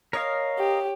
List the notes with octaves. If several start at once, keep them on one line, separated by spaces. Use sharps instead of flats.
A#4 C#5 D#5 F5
G4